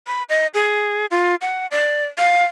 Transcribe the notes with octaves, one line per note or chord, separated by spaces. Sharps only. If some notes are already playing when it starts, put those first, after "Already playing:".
B5
D#5
G#4
F4
F#5
D5
F5